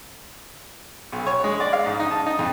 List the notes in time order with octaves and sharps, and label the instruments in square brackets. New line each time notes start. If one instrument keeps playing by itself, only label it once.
[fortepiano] B1
C#5
G#3
D5
F5
G#2
D#4
A5
D#4
F2